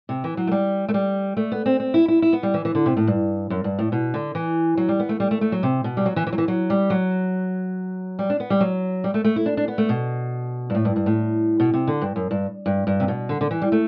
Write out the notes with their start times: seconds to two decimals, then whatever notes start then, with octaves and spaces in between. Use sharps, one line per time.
0.09 C3
0.24 E3
0.37 F#3
0.47 A3
0.52 G3
0.89 A3
0.94 G3
1.37 A3
1.52 B3
1.66 C4
1.80 C4
1.94 E4
2.08 E4
2.22 E4
2.33 B3
2.43 G3
2.54 E3
2.65 E3
2.75 D3
2.86 C3
2.97 A2
3.07 G2
3.50 F#2
3.64 G2
3.79 A2
3.92 B2
4.14 D3
4.35 E3
4.77 F#3
4.89 G3
5.00 B3
5.09 A3
5.20 G3
5.31 A3
5.41 A3
5.52 F#3
5.63 C3
5.84 B2
5.97 G3
6.06 F#3
6.16 E3
6.27 E3
6.33 F#3
6.38 E3
6.48 F#3
6.70 G3
6.90 F#3
8.19 G3
8.30 D4
8.40 B3
8.50 G3
8.60 F#3
9.04 G3
9.14 A3
9.24 A3
9.36 E4
9.46 D4
9.57 D4
9.68 B3
9.78 A3
9.89 B2
10.70 G2
10.75 A2
10.85 G2
10.96 G2
11.06 A2
11.60 B2
11.74 C3
11.88 D3
12.01 G2
12.16 F#2
12.31 G2
12.66 G2
12.87 G2
13.00 C3
13.08 B2
13.29 D3
13.41 D3
13.51 E3
13.62 G3
13.72 A3